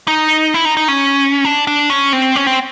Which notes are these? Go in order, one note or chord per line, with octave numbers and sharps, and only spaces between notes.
D#4
E4
D#4
D#4
C#4
D4
D4
C#4
C4
C#4
C4